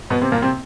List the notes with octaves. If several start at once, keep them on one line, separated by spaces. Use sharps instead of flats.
B2 B3
C3 C4
A#2 A#3
C3 C4